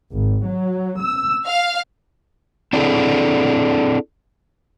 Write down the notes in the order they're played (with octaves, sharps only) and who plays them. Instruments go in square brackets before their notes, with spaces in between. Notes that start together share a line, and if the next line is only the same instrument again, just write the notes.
[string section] G#1
F#3
E6
F5
[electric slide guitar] C4 D4 E4 G#4 A4